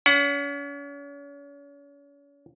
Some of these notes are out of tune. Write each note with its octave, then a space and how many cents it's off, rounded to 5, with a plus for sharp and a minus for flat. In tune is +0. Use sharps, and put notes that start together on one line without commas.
C#4 +40 F#5 +0